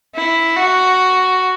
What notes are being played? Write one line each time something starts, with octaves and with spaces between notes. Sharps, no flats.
E4
F#4